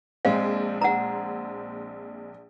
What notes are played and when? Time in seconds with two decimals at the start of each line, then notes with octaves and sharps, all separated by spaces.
0.25 A#1 G#3 C4 F5
0.81 F#5 A#5